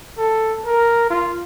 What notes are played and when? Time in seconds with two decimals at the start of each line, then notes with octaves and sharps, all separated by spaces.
0.18 A4
0.66 A#4
1.10 F4